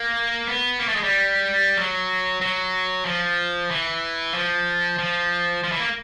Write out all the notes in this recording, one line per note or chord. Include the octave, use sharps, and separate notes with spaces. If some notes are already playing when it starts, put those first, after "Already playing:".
Already playing: A#3
B3
A#3
A3
G#3
G3
F#3
F#3
F3
E3
F3
F3
F3
E3
A#3